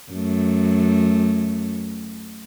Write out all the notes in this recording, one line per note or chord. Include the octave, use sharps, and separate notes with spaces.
F#2 A3